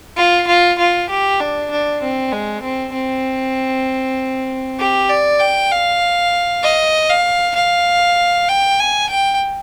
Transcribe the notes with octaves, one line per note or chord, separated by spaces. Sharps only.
F4
F4
F4
G4
D4
D4
C4
G#3
C4
C4
G4
D5
G5
F5
D#5
F5
F5
G5
G#5
G5